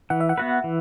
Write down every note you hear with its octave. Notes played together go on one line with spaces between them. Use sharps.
E3 F#5
E5
F#5
B3 F#4 B4
E3